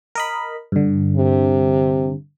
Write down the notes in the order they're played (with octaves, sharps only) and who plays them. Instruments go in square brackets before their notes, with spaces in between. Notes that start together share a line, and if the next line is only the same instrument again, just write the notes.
[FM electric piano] A#4 D#5 B5
G2 D3
[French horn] C3